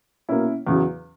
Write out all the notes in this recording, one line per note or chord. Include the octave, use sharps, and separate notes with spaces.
B2 A#3 C#4 E4
E2 C#3 F#3